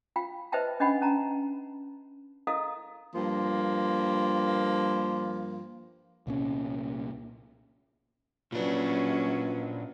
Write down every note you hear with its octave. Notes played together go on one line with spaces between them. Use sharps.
F4 F5 G5
B4 C5 D#5 E5 G5 A5
C#4 D4 D#5 F#5 G5 B5
C#4 A5 A#5
E4 A4 A#4 D#5 F5
G2 F3 A#3
C2 A#2 C#4
A#2 F#3 C#4 D4 F4 B4